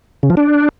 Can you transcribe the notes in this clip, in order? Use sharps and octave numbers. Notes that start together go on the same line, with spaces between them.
C#3
F3
D4